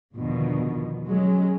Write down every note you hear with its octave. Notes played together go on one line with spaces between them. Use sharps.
E2 G#2 B2 D3 D#3 F3
F#3 G#3 C#4